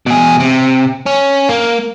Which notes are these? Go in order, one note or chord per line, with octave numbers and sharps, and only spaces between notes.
B2 G#4
C3
C#4
A#3